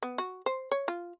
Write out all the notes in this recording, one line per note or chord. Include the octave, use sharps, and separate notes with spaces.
B3
F#4
C5
C#5
F4